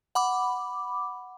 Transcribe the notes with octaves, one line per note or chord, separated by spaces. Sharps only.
F#5 B5 D6